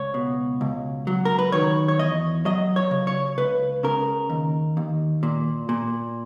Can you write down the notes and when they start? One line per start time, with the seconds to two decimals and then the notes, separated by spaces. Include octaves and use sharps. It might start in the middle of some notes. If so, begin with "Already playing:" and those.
Already playing: C#2 C#5
0.14 B2
0.61 C#2
1.07 F#3
1.25 A#4
1.39 B4
1.52 D#3 C#5
1.88 C#5
1.99 E2 D#5
2.45 F#3 D#5
2.76 C#5
2.91 C#3
3.07 C#5
3.38 C#2 B4
3.83 C#3 A#4
4.30 D#2
4.77 D#2
5.23 A#2
5.69 A#2